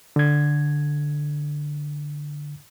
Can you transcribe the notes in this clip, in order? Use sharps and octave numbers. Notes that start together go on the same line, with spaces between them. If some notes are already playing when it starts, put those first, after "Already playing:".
D3 G#6